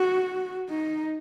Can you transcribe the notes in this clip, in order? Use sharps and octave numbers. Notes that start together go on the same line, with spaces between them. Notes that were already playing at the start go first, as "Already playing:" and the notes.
Already playing: F#4
D#4